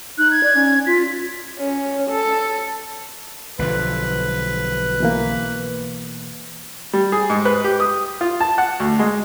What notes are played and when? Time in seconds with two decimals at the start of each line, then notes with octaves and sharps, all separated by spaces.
0.18 D#4 F#6
0.31 G#6
0.43 D5
0.55 C#4
0.86 F4 B6
1.59 C#4
2.10 A4
3.59 B1 D3 F3 B4
5.00 B2 E3 A#3
6.93 G3
7.12 G#4
7.30 G#2
7.45 B4
7.64 G4
7.80 D#6
8.21 F4
8.40 A5
8.58 F#5
8.80 D2
8.99 G#3